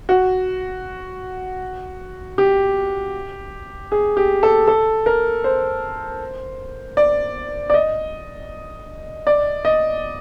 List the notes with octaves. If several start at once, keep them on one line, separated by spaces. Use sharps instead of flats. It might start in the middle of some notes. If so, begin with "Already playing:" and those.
F#4
G4
G#4
G4
A4
A4
A#4
C5
D5
D5
D#5
D5
D#5